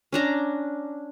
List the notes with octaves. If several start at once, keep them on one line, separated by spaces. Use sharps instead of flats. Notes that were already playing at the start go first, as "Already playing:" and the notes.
C#4 D4 A#5